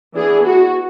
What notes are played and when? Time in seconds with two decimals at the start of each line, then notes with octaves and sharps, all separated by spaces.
0.15 E3 B3 D4 G#4
0.46 F#4